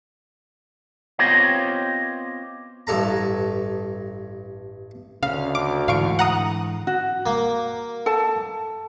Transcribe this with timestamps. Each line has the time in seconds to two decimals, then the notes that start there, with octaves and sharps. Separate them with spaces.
1.19 B3 C4 F4 G4 C#5 D#5
2.87 A1 G2 A4 A#5
5.23 D2 C#3 F5
5.55 D6
5.88 G#2 D3 E3 F5 C#6 D7
6.19 F#5 A#5 D#6
6.87 F#4
7.26 A#3
8.06 A4 A5